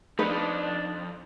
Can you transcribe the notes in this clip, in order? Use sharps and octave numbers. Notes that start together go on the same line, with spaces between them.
F2 D4 D#4 B4